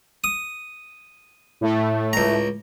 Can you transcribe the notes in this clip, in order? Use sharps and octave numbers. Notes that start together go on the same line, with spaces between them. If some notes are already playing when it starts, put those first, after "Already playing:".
D#6
A2 A3
C#2 A#5